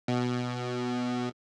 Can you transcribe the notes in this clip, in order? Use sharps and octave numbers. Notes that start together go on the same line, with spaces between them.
B2